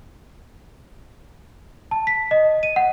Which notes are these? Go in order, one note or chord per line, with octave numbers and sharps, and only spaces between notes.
A5
B6
D#5
D#7
F#5